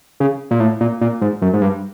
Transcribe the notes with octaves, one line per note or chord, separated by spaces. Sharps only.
C#3
A#2
A2
A#2
A#2
G#2
F#2
G#2
G2